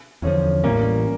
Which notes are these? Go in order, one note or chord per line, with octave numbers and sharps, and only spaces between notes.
E2 D3 F3 C#4
A1 A2 G3 A#3 C#4